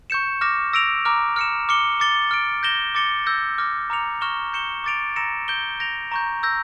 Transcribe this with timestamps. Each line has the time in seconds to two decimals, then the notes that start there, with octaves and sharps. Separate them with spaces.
0.10 C#6 G6 C#7 E7
0.41 D6 F6 A#6 E7
0.73 E6 A#6 D7 F7
1.05 A#5 D6 F6
1.36 F6 C#7 E7
1.69 D6 F6 C#7 G7
2.00 D6 A6 C#7 G7
2.31 F6 A6 D7
2.63 G6 A#6 E7 G7
2.95 D6 A6 C#7 G7
3.26 E6 G6 A#6
3.58 D6 F6 A#6
3.90 A#5 D6 F6 C#7 F7
4.21 C#6 F6 A#6 E7 G7
4.53 G6 C#7 E7 G7
4.84 D6 A6 D7 F7
5.16 A#5 E6 A#6 C#7 E7
5.48 G6 D7 G7
5.80 G6 A#6 D7 F7
6.12 A#5 C#6 G6
6.43 E6 G6 A#6